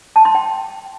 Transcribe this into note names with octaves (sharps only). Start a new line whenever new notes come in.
A5
C6
G5